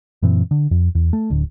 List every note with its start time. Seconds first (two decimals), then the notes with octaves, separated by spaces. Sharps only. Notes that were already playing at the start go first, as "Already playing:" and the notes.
0.22 F#2 A#2 E3 C4
0.51 D3
0.71 F2
0.95 E2
1.13 A3
1.30 D1 D3